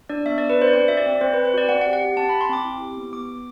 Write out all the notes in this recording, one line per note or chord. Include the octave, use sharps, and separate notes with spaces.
D4 D5
B3 E5
B3 D5
B4
D4 C5
D5
C4 C5
F#4 E5
D5
C4
C4 C5
C4 B4
C5
F#4 D5
C4 F#5
F#5
G4
F#5
G4
C4 A5
C4 B5
C6
C4 D6
E4
G4
B3
B3 D6
B3